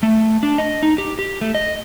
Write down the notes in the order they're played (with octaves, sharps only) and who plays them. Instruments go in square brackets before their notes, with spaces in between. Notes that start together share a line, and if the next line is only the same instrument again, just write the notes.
[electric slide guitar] A3
D4
D#5
D#4
G4
G4
A3
D#5